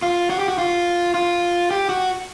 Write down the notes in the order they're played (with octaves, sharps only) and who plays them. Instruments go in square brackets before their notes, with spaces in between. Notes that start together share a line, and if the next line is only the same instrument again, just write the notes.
[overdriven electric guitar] F4
F#4
G4
F#4
F4
F4
G4
F#4